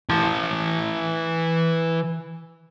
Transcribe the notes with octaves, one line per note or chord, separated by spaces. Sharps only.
E3 A5